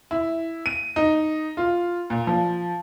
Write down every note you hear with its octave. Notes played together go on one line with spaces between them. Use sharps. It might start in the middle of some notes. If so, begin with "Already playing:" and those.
E4
D#7
D#4
F4
A#2
F3